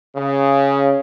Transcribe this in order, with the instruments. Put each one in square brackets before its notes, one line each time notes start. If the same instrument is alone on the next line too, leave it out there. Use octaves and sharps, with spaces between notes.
[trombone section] C#3